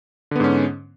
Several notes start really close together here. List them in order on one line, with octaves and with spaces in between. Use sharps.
D3 B3 G#2 C#4